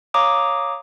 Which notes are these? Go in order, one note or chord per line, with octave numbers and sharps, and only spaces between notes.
C#5 F5 A#5 D6 D#6